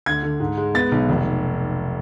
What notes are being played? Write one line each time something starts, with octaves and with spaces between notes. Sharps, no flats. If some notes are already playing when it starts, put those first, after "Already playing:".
D2 G#6
D3
G#2
G#3
B3 A6
B1
F1